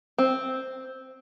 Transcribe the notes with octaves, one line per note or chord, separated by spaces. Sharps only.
C4